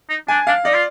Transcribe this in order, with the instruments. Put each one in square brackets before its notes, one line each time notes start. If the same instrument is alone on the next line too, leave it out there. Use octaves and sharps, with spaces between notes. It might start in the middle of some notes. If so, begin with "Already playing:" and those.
[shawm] D#4
[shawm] D4 [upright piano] G#5
[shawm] D4 [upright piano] F5
[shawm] D#4 [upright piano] D5
[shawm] F4